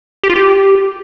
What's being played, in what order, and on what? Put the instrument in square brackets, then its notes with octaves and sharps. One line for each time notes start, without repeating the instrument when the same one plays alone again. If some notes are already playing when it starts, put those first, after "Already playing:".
[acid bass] G4
F4
G4